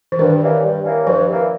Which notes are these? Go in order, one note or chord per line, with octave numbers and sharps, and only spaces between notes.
E3
G2 D#3
E3 G3 A#3 C#4
G2
E3 G3 A#3 C#4
G2 F3
E3 G3 A#3 C#4